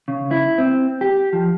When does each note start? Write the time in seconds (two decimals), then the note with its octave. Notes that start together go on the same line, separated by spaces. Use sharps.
0.08 C#3
0.31 E4
0.58 C4
1.01 G4
1.33 F3